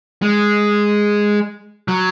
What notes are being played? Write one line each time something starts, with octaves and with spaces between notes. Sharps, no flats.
G#3
F#3